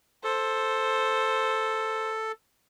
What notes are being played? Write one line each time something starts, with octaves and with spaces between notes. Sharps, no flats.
A4 C5